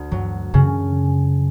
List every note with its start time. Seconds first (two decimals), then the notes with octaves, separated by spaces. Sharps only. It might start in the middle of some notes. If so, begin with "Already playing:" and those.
Already playing: D2
0.11 G2 F#3
0.54 F#2 C#3